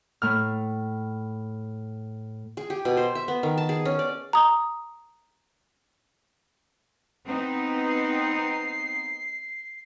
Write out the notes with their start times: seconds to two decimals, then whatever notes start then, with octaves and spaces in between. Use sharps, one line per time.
0.22 A2 F6
2.57 G#4
2.70 G4
2.85 B2
2.97 C5
3.15 E5
3.28 B3
3.43 D#3
3.58 A5
3.69 G#4
3.85 C#4
3.99 D5
4.33 A#5 D#6
7.25 B3 C4 D#4
7.88 C7